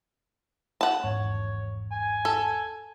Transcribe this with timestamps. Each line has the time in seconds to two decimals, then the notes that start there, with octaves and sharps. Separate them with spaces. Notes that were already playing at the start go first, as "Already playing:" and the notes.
0.81 F#5 A5
1.04 G#1 E2 G#2 C#5
1.92 G#5
2.25 A4